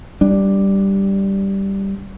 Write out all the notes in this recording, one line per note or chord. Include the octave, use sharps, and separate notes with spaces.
G3 D4